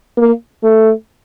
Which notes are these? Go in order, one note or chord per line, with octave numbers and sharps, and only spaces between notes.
A#3
A3